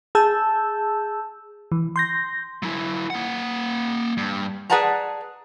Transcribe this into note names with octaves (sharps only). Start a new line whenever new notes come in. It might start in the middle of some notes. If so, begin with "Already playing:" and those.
G#4 A5 E6 G6
E3
C6 G6 A#6
F#3 E4
A#3 F#5
G2
G#4 B4 D5 F#5 A5 A#5